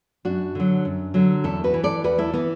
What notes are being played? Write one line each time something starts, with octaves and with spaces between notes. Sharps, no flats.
F#2 D4 F#4
D3 F#3
F#2
D3 F#3
E2 E4 A4
F#4 B4
E3
A4 D5
E2 F#4 B4
E4 A4
E3 B3